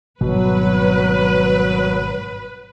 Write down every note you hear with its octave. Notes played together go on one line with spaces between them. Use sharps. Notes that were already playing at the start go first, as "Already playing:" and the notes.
G#1 G2 B2 F#3 B4